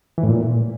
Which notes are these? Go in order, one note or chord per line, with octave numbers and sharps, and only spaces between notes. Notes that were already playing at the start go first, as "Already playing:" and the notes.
E3
A2
A#2